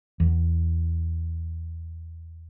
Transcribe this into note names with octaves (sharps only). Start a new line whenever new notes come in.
E2